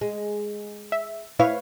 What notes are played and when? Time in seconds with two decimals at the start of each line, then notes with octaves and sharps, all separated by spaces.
0.01 G#3
0.92 E5
1.39 E4 B4 C#5 F5